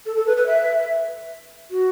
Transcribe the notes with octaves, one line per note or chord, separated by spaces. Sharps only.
A4
A4
B4
B4
E5
F#4